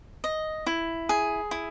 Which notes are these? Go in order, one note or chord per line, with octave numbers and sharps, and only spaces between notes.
D#5
E4
G#4
E4